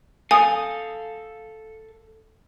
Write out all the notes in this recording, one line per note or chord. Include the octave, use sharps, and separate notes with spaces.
A4 F5 G#5 D#6